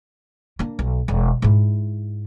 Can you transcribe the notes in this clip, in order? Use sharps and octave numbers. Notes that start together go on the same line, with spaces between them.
A#3 D4
B1
E1
G#2 E4